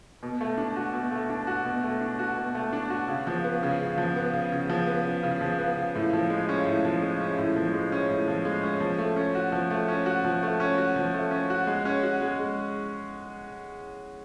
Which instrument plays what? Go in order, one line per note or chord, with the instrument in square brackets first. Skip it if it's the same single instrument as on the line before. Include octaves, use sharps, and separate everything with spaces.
[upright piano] B2
A3
D4
F#4
B2
A3
D4
F#4
B2
A3
D4
F#4
B2
A3
D4
F#4
C#3
F3
B3
C#3
C#3
F3
B3
C#3
C#3
F3
B3
C#3
C#3
F3
B3
C#3
A2
F3
G#3
C#4
A2
F3
G#3
C#4
A2
F3
G#3
C#4
A2
F3
G#3
C#4
F3
A3
C#4
F#4
F3
A3
C#4
F#4
F3
A3
C#4
F#4
F3
A3
C#4
F#4
G#3
C#4
F#4
G#3
G#3